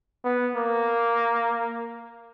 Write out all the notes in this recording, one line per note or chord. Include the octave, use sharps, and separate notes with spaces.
B3
A#3